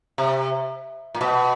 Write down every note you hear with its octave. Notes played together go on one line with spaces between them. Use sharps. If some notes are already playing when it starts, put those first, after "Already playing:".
C3
A#2
B2